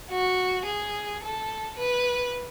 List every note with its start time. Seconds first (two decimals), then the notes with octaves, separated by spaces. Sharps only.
0.10 F#4
0.66 G#4
1.23 A4
1.78 B4